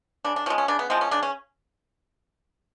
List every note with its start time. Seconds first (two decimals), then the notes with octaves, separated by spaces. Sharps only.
0.24 C#3 D4
0.36 D4
0.46 F3 C#4
0.50 G#3
0.58 C#4
0.68 C#3 D4
0.79 B3
0.90 F3 G#3 C4
1.01 C#4
1.11 C#3 D4
1.23 C#4